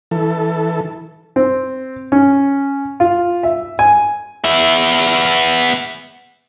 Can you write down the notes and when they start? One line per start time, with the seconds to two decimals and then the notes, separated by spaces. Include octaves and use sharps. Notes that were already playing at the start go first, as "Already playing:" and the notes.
0.11 E3 A4
1.36 C4
2.12 C#4
3.00 F4
3.43 E5
3.79 G#5
4.44 B3 E5